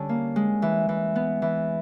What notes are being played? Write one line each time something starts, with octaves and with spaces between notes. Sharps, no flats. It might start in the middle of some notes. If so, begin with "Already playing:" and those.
Already playing: D3 G3 C#4
A#3
G#3
E3
E3
B3
E3